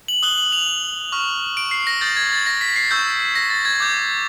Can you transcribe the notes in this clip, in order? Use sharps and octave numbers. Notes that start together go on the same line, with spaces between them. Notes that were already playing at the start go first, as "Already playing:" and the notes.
F#7
D#6 F#6 G7
F#7
F7
C#6 F6
D7
C7
A#6
D#6 G6 A6
G#6
A6
A#6
B6
C7
C#6 E6 G6
A#6
A6
G#6
D6 G6